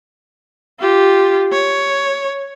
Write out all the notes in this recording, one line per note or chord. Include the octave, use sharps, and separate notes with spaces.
F4 G4
C#5